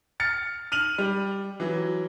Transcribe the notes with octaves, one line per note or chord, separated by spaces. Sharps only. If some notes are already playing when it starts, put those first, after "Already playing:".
F6 A6 C#7
F6 D#7 F7 F#7
G3
E3 F#3